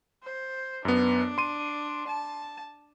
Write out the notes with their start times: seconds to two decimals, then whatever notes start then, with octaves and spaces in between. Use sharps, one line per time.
0.23 C5
0.85 F#2 B3 D4
1.38 C6 D#7
2.08 A5